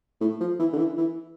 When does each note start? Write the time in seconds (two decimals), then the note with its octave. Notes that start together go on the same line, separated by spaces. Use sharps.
0.21 A2
0.40 F3
0.59 E3
0.73 D3
0.78 E3
0.97 E3